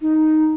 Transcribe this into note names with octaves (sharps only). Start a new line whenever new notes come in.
D#4